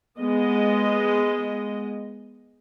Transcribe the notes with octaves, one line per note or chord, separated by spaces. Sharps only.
G#3 B3 D#5